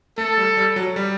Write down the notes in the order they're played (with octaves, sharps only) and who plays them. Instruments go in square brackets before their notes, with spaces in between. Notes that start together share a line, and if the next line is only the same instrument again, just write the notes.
[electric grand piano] A3 [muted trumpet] A4
[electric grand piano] G3
G3
F#3
G3